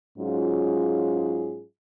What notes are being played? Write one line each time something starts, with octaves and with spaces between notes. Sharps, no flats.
G#2 F#3 C#4 F4 G#4